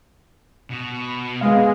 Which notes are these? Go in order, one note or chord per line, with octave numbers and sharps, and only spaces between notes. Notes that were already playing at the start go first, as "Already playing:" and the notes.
B2
G#3 B3 F5